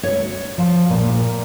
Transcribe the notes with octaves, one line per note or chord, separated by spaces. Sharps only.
C#5
F3
A#2